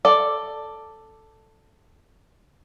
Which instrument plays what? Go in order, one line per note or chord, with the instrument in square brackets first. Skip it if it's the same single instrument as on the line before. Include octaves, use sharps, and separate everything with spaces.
[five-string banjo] A4 D5